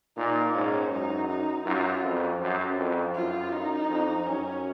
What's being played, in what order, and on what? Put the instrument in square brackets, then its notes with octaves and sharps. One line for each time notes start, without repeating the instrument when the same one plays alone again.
[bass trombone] A#2 [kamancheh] D#4
[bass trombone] G#2 [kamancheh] C#4
[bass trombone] F#2 [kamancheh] D#4
[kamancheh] D#4
[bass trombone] F#2 [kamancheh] F4
[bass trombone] F2
F#2
F2
[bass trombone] F#2 [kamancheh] F4
[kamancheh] D#4
[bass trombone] F2
[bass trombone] F#2 [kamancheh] C#4